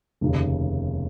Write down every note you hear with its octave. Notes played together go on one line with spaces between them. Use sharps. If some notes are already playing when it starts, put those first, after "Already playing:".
F1 D#2 C#3